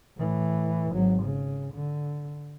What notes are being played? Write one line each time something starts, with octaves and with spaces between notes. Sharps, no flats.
A2 E3
G#1 F#3
C#3
D3